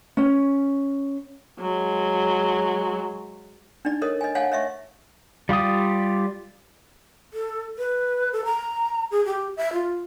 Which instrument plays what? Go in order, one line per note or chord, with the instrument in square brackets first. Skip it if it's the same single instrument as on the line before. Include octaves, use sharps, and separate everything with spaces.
[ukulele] C#4
[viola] F#3 G#3
[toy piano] D4 D#4 D5
A4 A#4 C#5 D#5 D#6
D#5 G#5
C#5 F5 F#5 G#5 A5
C#5 D#5 E5 C#6
[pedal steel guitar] G3 F4 G4 D#6
[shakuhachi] A4
B4
A4
A#5
G#4
G4
E5
F4